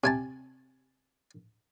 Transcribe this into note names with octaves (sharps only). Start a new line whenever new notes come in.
C3 G#5 A5